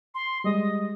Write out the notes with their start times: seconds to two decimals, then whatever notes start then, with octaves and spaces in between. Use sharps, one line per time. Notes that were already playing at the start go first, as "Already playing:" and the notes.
0.15 C6
0.44 G3 G#3 D#5